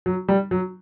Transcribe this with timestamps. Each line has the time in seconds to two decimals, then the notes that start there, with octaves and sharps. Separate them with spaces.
0.06 F#3
0.28 G3
0.51 F#3